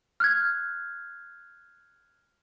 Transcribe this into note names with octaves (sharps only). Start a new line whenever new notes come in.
F6 F#6 G#6